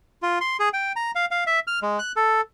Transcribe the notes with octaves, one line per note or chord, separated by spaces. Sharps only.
F4
C6
G#4
G5
A#5
F5
F5
E5
F6
G#3
F#6
A4